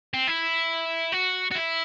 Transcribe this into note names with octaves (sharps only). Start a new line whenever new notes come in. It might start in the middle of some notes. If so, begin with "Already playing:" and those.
C4
E4
F#4
F#4
E4